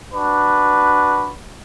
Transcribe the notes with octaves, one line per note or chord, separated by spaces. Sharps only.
D4 F#4 B4